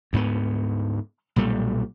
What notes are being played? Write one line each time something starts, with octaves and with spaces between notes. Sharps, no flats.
D2 G#2 A#3 B3
B1 A#2 G3 A3